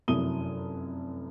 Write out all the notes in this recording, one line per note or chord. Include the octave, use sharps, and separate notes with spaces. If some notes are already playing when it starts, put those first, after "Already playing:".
F1 F#2 E4 D#6 D#7 G7